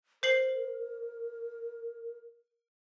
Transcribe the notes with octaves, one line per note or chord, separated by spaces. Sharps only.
A#4 C5 C7 F#7